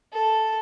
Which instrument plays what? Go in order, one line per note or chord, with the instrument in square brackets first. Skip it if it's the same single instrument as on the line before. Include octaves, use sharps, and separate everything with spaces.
[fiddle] A4